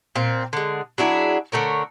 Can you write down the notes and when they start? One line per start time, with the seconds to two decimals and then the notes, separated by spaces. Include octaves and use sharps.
0.16 A#2 C4
0.53 D3 G#3
0.98 F#3 D4 E4 G#4
1.52 D3 A3 A#4 C#5